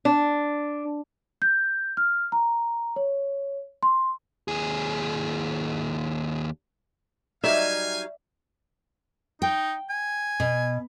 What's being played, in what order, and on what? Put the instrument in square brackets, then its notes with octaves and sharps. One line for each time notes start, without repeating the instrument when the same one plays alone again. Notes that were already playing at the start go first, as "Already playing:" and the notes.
[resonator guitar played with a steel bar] D4
[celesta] G6
F6
A#5
C#5
C6
[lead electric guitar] D#2 G#4
[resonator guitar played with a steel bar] F#3 G3 D#4 [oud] D5 [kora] E5 [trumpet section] F5 G#5
[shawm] D#4 [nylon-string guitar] G5
[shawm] G#5
[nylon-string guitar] B2